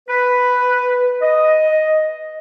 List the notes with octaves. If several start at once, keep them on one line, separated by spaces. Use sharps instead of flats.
B4
D#5